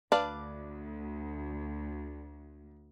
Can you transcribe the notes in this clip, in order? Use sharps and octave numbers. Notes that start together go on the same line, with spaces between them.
D2 D4 B4 D5 F5